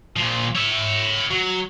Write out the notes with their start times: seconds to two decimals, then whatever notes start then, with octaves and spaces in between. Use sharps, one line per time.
0.16 A#2 F3
0.55 C#5 E5
1.31 F#3